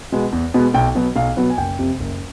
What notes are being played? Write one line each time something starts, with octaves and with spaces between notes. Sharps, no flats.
B2 G#3 B3
E2
B2 G#3 B3
B1 G5
B2 F#3 B3
B1 F5
B2 F#3 B3
G#5
F#1 G5
F2 C3
F#1